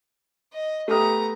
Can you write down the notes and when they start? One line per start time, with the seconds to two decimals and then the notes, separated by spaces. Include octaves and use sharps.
0.53 D#5
0.88 A3 B3 G4 A#5 D#6